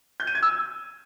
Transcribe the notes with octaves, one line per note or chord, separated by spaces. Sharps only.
G6
D#7
G#6
E6